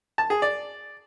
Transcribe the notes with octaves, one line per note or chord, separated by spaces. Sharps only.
A5
G#4
D5